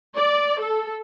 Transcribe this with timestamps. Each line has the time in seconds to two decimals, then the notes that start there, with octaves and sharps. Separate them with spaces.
0.16 D5
0.60 A4